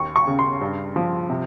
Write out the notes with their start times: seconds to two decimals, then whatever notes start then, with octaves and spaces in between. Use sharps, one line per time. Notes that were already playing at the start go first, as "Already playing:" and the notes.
Already playing: D#2 C#6
0.16 C#6
0.27 C#3
0.39 C6
0.61 G2
0.96 F3
1.30 C3